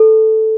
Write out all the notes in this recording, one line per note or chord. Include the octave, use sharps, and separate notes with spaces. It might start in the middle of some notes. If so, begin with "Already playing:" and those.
Already playing: A4